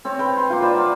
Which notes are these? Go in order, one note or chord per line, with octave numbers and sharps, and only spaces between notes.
C4 C#5
B4 G5
C6
A#3 F4
B4 C5 D5 B5
F5 F#5 A#5